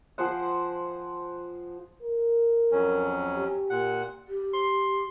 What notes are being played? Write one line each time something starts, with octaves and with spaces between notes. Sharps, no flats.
F3 G#4 C5 F#5
A#4
F2 F#3 C#4
G4
A#2 F#5
G4
C6